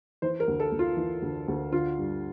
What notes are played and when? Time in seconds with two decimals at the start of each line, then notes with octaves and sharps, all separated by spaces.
0.22 E3 C5
0.40 A#4
0.48 D2
0.60 A4
0.72 D2
0.79 F4
0.97 E3
1.22 D2
1.48 D2
1.72 D3 F4
1.98 G2